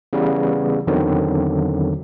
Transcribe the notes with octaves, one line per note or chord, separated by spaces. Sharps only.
C#3 E3 G3 B3
E2 D3 D#3 F#3 C4